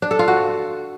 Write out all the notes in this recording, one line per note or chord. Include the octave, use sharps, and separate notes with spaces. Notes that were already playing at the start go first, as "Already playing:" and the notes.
D4
A4
F4
F#4